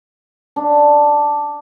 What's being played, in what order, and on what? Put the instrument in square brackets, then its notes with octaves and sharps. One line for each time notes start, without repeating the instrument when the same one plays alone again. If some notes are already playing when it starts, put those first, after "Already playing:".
[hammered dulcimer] D4